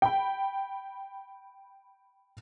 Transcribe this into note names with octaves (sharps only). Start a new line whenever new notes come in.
G5 B5